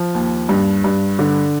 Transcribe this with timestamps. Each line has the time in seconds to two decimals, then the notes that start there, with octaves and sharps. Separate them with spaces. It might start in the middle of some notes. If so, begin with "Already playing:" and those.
Already playing: F3
0.15 D#2
0.49 G2
0.84 G2
1.19 D3